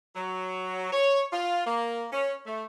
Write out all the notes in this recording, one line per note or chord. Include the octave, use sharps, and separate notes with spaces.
F#3
C#5
F4
A#3
C#4
A3